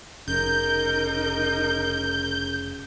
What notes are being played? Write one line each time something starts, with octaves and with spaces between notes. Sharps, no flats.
F1 C#3 D#4 A#4 G6